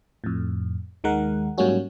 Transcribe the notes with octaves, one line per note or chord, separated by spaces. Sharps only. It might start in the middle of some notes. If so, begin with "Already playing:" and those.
F2 A2
D#2 D#3 G#3 A#4 F#5
G#2 F#3 G3 A#3 C#4 F#4